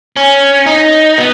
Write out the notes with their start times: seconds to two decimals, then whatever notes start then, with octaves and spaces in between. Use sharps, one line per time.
0.16 C#4
0.66 D#4
1.18 B3